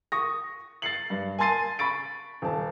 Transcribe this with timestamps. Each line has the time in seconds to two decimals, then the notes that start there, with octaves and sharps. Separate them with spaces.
0.12 C#6 D#6 A#6
0.82 A6 C7 C#7 F#7
1.10 G2
1.39 G#5 A5 C6 A6 C7 D#7
1.79 B5 C#6 A6 D7
2.42 D#1 A5